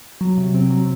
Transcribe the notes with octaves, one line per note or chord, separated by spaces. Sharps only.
F#3
C3
C4
F#3